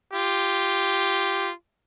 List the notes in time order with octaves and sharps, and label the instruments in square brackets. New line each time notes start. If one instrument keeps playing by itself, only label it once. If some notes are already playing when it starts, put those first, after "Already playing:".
[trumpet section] F4 G4